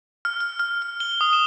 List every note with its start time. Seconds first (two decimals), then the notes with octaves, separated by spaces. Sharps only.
0.25 F6
0.40 F6
0.59 F6
0.82 F6
1.00 G7
1.21 D#6
1.33 E7